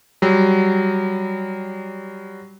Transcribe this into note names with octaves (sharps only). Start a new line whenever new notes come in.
F#3 G3